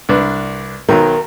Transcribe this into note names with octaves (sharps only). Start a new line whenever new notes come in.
C2 D4 B4
B1 D#3 F#3 A#4